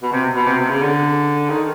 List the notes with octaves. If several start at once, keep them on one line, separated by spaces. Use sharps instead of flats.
B2
C3
B2
C3
C3
C#3
D3
D#3